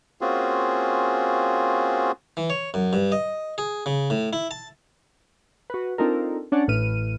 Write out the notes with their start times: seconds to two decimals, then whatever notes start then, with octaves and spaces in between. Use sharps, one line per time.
0.21 A#3 C4 C#4 F4 F#4 G#4
2.37 E3
2.50 C#5
2.74 F#2
2.93 G2
3.12 D#5
3.58 G#4
3.86 C#3
4.10 A2
4.33 E4
4.51 A5
5.70 F#4 B4
5.98 C4 D4 D#4 F4 A4 A#4
6.52 C#4 D4 C#5 D5 F#5
6.68 A1 A2 B4 F6 D#7